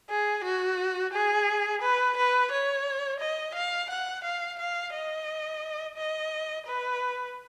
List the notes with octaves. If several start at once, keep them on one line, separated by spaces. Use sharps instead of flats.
G#4
F#4
G#4
B4
B4
C#5
D#5
F5
F#5
F5
F5
D#5
D#5
B4